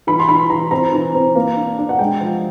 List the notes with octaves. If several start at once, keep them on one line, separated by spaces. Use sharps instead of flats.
E3 B5
C6
E3 B5
E3 A#5
C4 A#5
E3
C4
A#3
D4
D4
F#5
G#3 G5
F3